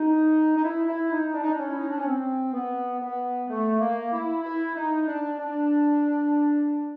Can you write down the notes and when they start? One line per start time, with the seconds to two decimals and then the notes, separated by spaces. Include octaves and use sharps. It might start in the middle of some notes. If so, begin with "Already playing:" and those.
Already playing: D#4
0.56 D#4
0.63 E4
0.86 E4
1.10 D#4
1.34 D4
1.41 D#4
1.50 D4
1.58 C#4
1.69 E4
1.77 D#4
1.87 D4
1.97 C#4
2.06 C4
2.52 B3
3.00 B3
3.48 A3
3.79 A#3
4.12 E4
4.43 E4
4.75 D#4
5.06 D4
5.38 D4